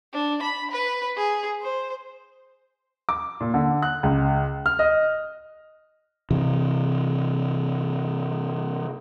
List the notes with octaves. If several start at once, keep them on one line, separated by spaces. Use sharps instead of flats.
D4
B5
B4
G#4
C5
D6
A#2
D3
F#6
C#2
F6
D#5
C3 E3